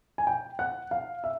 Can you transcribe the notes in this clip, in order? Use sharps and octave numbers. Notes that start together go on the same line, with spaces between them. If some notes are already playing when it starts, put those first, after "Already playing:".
G#5
G5
F#5
F5
E5